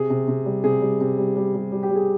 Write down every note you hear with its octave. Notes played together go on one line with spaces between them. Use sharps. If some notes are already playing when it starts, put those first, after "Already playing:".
Already playing: C3 G#4
C3
C3
G3
C3 G#4
G3
C3
G3
G3
G3
G3
G4
G3
G#4